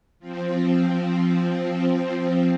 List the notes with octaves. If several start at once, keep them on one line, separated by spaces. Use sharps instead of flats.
F3 C4